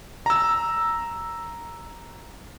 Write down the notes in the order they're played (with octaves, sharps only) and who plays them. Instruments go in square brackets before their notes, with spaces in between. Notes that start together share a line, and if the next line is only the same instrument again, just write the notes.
[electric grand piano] A#5 E6